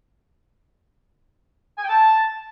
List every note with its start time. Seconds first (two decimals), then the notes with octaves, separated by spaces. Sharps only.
1.78 G#5
1.83 G5
1.88 A5